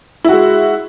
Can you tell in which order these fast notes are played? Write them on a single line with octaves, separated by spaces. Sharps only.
E4 F#4 G#3